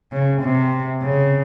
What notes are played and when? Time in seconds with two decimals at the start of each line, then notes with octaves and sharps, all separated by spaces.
0.12 C#3
0.43 C3
1.03 C#3